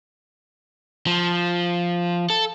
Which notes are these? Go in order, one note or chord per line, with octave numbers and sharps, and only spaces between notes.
F3
A4